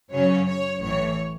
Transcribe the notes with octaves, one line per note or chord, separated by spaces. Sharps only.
F#2 C#3 F#3 C#4 C#5
C#5
A1 A2 E3 C#5